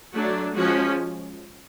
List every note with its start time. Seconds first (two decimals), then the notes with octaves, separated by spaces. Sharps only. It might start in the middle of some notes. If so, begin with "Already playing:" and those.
0.13 F#3 A3 D4 F#4
0.55 F3 G#3 C#4 F#4